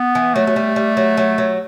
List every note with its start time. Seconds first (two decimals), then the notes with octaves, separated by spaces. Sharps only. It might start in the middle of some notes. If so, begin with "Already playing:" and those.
Already playing: B3
0.15 E3
0.34 F#3 A3
0.47 F#3
0.56 G3
0.76 G3
0.97 F#3
1.17 F#3
1.38 F#3